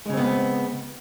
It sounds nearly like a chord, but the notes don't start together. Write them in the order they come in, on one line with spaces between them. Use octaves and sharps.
G#3 C#3 C4 B3